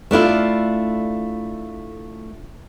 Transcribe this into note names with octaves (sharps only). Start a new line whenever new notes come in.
A3 D4 E4 F4